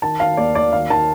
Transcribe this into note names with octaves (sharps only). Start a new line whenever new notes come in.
D#3 A5
D#3 F5
D#2 D5
D#2 D5
D#3 F5
D#3 A5